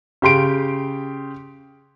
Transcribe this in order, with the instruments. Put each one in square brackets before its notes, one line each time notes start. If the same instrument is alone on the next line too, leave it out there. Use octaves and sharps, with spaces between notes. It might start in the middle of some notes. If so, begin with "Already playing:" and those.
[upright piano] C#3 G4 C6 D7